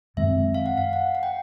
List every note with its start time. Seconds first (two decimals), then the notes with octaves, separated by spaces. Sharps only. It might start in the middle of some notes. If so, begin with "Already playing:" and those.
0.17 F#2 D#3 G#3 C4 E5
0.54 F5
0.66 F#5
0.78 F5
0.93 F#5
1.15 F#5
1.23 G5